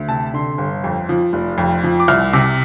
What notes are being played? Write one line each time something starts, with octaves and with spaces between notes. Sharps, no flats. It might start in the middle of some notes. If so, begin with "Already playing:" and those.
Already playing: D2
C3 A5
D3 C6
G1
F2
F3
F1
F2
F3
D6
C2 F6
C3 D6